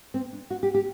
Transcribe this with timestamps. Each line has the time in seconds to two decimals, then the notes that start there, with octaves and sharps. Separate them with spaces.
0.14 C4
0.33 D4
0.51 F#4
0.63 G4
0.74 G4